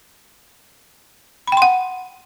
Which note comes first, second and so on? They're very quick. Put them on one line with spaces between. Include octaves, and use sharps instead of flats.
B5 G5 C6 F#5